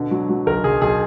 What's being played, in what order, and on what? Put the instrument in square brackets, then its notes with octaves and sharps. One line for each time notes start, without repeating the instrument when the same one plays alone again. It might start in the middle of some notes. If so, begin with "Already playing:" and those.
Already playing: [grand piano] B2 D3
F#3
F#3
B1 A#4
B1 G#4
B1 G#4